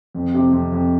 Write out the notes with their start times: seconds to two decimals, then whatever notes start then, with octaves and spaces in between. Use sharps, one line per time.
0.15 F2
0.34 C3
0.53 F2
0.72 F2